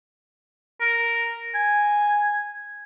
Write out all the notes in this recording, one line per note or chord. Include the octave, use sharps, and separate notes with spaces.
A#4
G#5